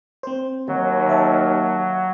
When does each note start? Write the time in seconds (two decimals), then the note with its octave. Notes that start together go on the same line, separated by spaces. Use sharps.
0.23 C4 C5
0.68 D#2 D#3 F#3
1.09 E5 F5 A5